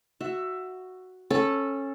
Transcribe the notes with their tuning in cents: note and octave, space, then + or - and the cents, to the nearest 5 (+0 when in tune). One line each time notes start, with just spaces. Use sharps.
F#4 +0 E5 +15
C#4 -15 A4 +0